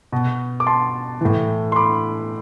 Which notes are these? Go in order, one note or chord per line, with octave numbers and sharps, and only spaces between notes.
B2
D6
A5 C6
A2 E3
C6
B5 D6